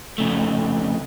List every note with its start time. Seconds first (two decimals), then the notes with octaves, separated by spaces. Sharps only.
0.18 F2 C#3 A3